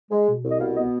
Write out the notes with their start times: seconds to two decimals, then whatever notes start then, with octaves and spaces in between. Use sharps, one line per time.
0.11 G#3
0.27 B2
0.43 C2
0.50 D#5
0.60 B2 F5
0.76 B3 D#5